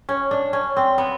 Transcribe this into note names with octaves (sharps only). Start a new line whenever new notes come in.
C#4
D4
C#4
C4
B3